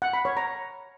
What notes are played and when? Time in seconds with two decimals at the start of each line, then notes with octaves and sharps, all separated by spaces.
0.02 F#5
0.13 B5
0.25 C#5
0.37 A#5